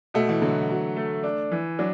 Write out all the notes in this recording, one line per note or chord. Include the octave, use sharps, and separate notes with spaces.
B2 A3
E3
D3 F#3
F#3
A3
D4
E3
F#3 D4